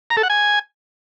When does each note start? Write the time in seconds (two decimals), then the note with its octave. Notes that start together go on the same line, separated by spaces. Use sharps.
0.10 A#5
0.17 A4
0.23 F#5
0.30 G#5